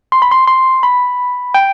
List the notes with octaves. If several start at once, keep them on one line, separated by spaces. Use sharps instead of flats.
C6
B5
C6
C6
B5
G5